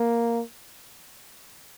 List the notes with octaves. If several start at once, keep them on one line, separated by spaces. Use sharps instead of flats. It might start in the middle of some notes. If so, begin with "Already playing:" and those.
Already playing: A#3